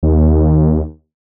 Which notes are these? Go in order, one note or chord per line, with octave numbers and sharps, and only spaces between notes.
D#2